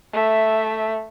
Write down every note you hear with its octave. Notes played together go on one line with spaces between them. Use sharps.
A3 E5